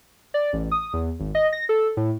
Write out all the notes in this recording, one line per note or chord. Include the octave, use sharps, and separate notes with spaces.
D5
A1
D#6
E2
G#1
D#5
A#6
A4
A2